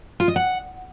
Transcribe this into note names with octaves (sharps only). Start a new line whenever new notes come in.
F4
D#5
F#5